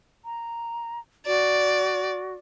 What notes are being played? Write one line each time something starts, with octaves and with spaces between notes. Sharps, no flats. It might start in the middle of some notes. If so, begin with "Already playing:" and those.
A#5
F#4 D5